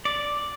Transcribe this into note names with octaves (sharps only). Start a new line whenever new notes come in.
D5